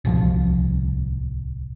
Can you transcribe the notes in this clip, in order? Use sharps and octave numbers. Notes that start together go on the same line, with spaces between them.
D1 C2 F3